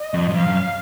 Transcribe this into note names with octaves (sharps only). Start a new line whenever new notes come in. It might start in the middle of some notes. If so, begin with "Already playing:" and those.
Already playing: D#5
F2
F#2
F2 F5
F#2